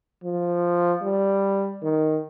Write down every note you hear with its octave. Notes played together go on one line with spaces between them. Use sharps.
F3
G3
D#3